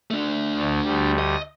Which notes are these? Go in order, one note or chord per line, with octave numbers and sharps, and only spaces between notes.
A3 D4
D2
D2 G3
D#5